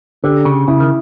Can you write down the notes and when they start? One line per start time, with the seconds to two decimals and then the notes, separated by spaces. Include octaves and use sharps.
0.24 D3 G4
0.45 C#3
0.68 C#3 E4
0.80 D#3